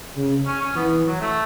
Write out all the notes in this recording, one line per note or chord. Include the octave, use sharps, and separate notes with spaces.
C#3
C#4
C#4
E3 B3
F#3
A3